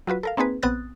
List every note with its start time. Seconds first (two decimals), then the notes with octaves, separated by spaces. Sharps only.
0.07 F#3 F4 F#4 B4
0.23 A4 A#4 F5
0.37 A#3 C4 D#4 G#4 B4
0.63 A#1 B3 C4 D#6 F#6 A6